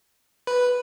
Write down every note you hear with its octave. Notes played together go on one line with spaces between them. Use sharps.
B4